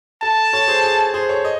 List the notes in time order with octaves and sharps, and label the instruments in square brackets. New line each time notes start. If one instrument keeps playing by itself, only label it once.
[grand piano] A4 [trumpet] A5
[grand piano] A4 C#5
G#4 C5
G#4
G#4 C5
A4 C#5
D#5